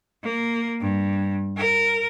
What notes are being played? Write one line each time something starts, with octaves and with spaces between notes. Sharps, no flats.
A#3
G2
A#4